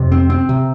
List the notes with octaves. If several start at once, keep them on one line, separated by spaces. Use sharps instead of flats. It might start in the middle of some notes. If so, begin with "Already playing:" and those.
Already playing: F2 C3
C4
C4
C3